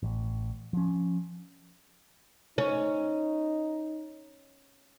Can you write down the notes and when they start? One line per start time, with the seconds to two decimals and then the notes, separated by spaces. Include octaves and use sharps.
0.03 A1
0.73 F3 C#4
2.58 C#4 D#4